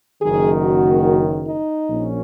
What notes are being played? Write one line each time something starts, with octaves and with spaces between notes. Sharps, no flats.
F#1 F#2 D#3 G#4
F#4
D#4
A#1 A#2 A#3 C#4